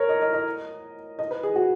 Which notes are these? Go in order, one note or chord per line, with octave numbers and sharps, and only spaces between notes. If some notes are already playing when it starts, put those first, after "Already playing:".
Already playing: A#4 C#5
D#5
D#5
D#5
D#5
B4
G#4
F#4